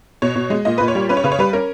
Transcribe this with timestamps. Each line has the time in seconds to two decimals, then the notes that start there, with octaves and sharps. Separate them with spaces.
0.22 B2 C#5
0.36 B2
0.50 G#3
0.65 A#2 D#5
0.78 A#2 B4
0.88 C#5
0.95 G3
1.09 C#4 B4
1.17 C#5
1.24 C#3 B4
1.32 C#5
1.39 G3 B4
1.53 C#4 A#4